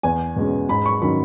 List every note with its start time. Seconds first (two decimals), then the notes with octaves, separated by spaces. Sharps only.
0.03 E2 G#5
0.36 B2 G#3 C#4
0.69 G#2 B5
0.86 C#6
1.02 D#3 F#3 C#4 B5